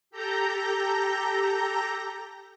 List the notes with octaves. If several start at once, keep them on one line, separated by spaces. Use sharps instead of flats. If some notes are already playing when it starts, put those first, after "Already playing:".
G4 A4 A#5 G6 A#6